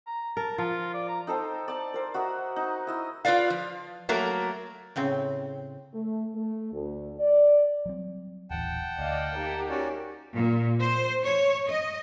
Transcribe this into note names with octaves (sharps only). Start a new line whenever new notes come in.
A#5
A#4 A5
F3 F4
D5
A#5
D#4 A4 C5 G5
D5 A5
A#4 C5
F#4 D#5 E5 A#5
D#4
E4 D#5 E6
F4 F#4 B4 D5 F5
F3
F#3 A3 A#3 A#4
A2 C#3 C4
A3
A3
D2
D5
F#3 G3 C4
D#1 A1 E3 F#5 G5 A5
D2 D5 D#5 F5
A#3 D#4 G4
C#4 F#4 D5
A#2
C5
C#5
D#5